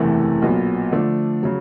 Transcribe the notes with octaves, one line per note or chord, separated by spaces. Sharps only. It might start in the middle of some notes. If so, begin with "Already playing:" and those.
Already playing: F#1 E2 C3 E3 A3
B1 A#2 F#3 B3
D3 F3 A3 D4
C#3 F#3